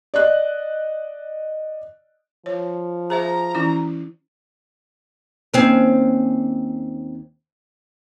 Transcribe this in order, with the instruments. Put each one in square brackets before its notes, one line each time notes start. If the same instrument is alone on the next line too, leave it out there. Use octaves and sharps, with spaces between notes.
[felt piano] D5 D#5 F#6
[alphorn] F3 [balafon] C#5
[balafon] G#4 C5 E5 [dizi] A#5
[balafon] E3 C#4 E4
[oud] D#2 C4 C#4